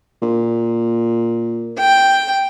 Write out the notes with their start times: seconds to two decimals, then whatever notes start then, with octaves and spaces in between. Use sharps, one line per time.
0.22 A#2
1.80 G5